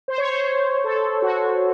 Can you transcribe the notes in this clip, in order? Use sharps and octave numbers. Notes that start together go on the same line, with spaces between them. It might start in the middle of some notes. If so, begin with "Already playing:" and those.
C5
C#5
C5
A4
F#4